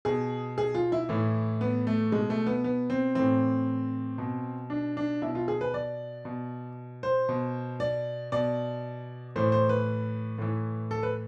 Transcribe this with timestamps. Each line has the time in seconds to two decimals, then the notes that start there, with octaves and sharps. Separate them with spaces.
0.05 B2 G#4
0.58 G#4
0.75 F4
0.92 E4
1.09 A2 E3
1.61 B3
1.87 A3
2.12 B2 G#3
2.30 A3
2.46 B3
2.64 B3
2.90 C4
3.15 A2 E3 C4
4.18 B2
4.70 D4
4.97 D4
5.22 B2 E4
5.35 F4
5.48 G#4
5.61 B4
5.74 D5
6.25 B2
7.03 C5
7.29 B2
7.80 D5
8.32 B2 D5
9.36 A2 E3 C5
9.52 C5
9.69 B4
10.39 A2 E3
10.91 A4
11.03 B4